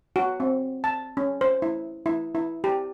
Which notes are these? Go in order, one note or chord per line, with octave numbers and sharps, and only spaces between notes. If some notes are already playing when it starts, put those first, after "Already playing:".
F#4
C4
A5
C#4
C5
E4
E4
E4
G4